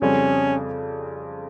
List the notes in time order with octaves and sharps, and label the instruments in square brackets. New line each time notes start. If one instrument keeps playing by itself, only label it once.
[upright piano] F2 C#3 G3 C4 [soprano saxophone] C#4